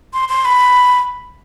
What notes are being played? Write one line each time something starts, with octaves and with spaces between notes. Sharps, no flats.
C6
C6
B5